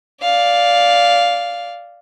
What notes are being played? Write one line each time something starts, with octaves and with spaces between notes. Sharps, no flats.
D5 F5